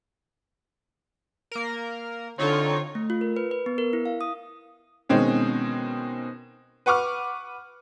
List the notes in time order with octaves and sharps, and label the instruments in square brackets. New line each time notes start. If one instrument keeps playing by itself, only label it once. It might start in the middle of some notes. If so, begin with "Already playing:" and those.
[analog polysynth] A#3 A#4
[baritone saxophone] D3 [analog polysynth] C4 D#4 F4 [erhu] C#5
[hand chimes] A3
F4
A#4
B4
B4
B3
A#4
E4
F5
D#6
[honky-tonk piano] B2 D#3 G#3 C4 C#4
B4 F#5 C#6 D6 F6